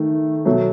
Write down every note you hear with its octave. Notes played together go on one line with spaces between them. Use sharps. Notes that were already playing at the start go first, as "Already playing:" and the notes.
Already playing: D#3 A3
B2 F#3 A3